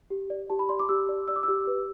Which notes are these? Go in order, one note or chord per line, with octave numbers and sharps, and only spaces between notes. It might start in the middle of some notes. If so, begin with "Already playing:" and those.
G4
D5
G4 A5
B5
D5 C6
D6
G4 E6
D5
D5 E6
D6
G4 E6
B4